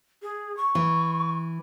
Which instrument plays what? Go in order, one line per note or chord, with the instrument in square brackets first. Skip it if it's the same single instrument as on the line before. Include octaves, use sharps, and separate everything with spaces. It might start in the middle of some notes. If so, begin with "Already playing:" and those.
[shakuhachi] G#4
C#6
[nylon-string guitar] E3